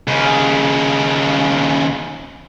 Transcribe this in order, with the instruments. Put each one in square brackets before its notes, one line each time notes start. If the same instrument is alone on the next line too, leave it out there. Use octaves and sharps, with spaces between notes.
[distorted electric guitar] D#2 C#3